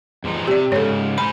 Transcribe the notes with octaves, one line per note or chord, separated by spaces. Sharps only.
E2 F3 D#4
C3 G4 D5
G#2 C#3 A4 C#5
C5 G#5 B5